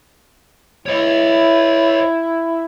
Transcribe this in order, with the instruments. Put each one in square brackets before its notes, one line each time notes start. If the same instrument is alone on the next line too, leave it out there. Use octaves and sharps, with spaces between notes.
[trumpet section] E4 [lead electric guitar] C#5 D#5